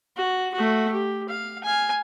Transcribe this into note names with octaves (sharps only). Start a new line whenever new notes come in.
F#4
A3 F#4
G4
F5
F5 G#5